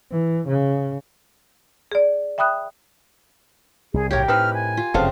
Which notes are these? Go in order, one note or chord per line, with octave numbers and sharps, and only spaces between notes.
E3
C#3
G#4 D5
E5 G5 B5 D#6 F#6
C2 G#4
B1 A2 C#3 G4 A#4 C#5
A2 C4 D#4 B4 F6
G#5
F4
F1 F#2 C#3 B3 C4 A4 F5